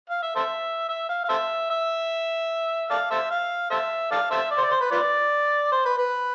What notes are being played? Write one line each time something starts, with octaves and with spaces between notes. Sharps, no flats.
F5
E5
A4 C5 E5
E5
F5
F5
A4 C5 E5
E5
A4 D5 F5
A4 C5 E5
F5
A4 C5 E5
A4 D5 F5
A4 C5 E5
D5
C5
D5
C5
B4
F4 B4 D5
C5
B4
B4